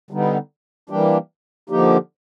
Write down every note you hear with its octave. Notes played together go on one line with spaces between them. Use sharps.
D3 G3 B3 D#4
E3 G3 A#3 D4 G4
D3 F3 A#3 D#4 G4